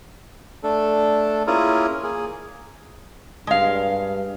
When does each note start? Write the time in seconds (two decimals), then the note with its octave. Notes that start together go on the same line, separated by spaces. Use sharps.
0.63 A3 D4 A4
1.47 A#3 C#4 E4 F4 G#4 A#4
2.03 A#3 G#4
3.47 G2 G#3 F5